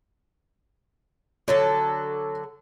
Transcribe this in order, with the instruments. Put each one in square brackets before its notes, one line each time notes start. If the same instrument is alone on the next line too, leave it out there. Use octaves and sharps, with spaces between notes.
[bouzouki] D3 F#3 A4 [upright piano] C#5